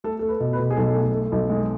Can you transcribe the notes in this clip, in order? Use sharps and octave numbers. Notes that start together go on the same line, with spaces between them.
A3 A4
A3 A4
B4
B2
B4
B2
G#4
B1 A4
A3
A3
B1
G#3